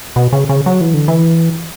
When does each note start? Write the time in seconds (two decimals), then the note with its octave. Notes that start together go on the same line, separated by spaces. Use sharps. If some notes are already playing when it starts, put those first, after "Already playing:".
0.16 B2
0.33 C#3
0.49 C#3
0.66 F#3
0.81 E3
0.94 D3
1.08 E3